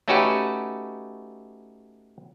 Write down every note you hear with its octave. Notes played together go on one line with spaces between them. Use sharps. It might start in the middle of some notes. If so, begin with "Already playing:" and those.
A3 C#4 D#4 F#4 G4 B4